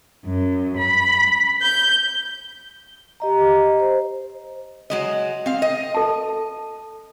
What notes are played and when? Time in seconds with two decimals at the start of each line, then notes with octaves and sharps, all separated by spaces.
0.25 F#2
0.78 B5
1.61 G6
3.20 G4 D#5 A#5
3.80 C5
4.90 F#3 G#3 D#5
5.46 C4 F5
5.62 D#5
5.94 A4 A5